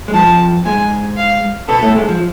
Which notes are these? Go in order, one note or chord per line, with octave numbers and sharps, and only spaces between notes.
G#3
F2 F3 A5
G#2 G#3 G#5
F5
B2 B3 A4
A2 A3
G#2 G#3
F3